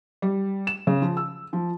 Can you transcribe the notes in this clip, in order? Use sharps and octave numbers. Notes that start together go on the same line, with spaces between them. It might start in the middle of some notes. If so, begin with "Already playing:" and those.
G3
E7
C#3
F3
E6
F3